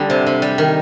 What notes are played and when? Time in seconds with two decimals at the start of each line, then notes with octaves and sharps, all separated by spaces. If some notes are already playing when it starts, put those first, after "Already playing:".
Already playing: D3 G3 G#4
0.10 C3
0.27 C3
0.42 G3
0.58 D#3